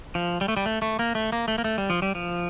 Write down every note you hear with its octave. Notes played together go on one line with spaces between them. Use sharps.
F3
G3
A3
G3
A3
A3
A#3
A3
A#3
A3
A#3
A3
G3
F3
G3
F3